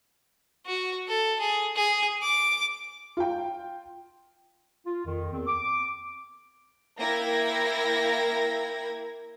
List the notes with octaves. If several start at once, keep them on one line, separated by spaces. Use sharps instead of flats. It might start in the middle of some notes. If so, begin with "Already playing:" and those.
F#4
A4
G#4
G#4
D6
F4 G5
F4
F2 D#3
E2 C4
D6
A#3 E4 A#4 G5 G#6 A#6